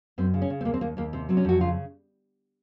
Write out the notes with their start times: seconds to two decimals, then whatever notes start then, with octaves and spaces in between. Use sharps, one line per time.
0.18 F#2 C4
0.34 C#3
0.42 C#4
0.50 C#3
0.61 C4
0.65 D#2 A#3
0.74 C4
0.81 D#2 A#3
0.97 D#2 A#3
1.13 C3 C4
1.29 F#3 C4
1.37 C#4
1.45 F2 F#4
1.60 C#3 F4